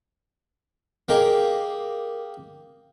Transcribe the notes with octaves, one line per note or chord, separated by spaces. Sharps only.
A#3 G4 G#4 A#4 D#5 F5